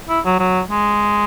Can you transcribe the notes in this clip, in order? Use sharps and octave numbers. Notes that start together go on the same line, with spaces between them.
E4
F#3
F#3
G#3